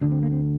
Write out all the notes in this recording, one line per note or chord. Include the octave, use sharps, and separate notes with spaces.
D2 D3 D4
C4
A#3
C4